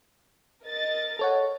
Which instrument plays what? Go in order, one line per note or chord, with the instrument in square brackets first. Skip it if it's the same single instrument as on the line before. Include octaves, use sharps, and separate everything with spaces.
[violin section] A#4 D#5 A6
[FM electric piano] A4 C#5 F#5